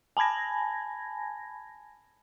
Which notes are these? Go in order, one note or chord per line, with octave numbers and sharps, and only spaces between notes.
G#5 A5 B5 G#6 A#6